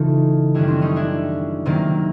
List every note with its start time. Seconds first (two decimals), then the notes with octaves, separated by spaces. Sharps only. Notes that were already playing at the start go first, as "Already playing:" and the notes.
Already playing: C#3 E3 A3 D#4 F4
0.54 F#2 D#3 G3 D4 E4
0.68 C4 D4
0.81 C#4 D#4
0.96 D4 E4
1.66 C3 D#3 F#3 A#3